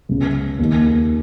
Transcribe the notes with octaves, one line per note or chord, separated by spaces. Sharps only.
C#2 C#3
D#2 D#3